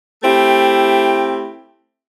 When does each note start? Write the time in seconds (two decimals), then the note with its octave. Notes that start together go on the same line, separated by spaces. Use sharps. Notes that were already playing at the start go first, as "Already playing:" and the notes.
0.23 A3 C4 E4 G4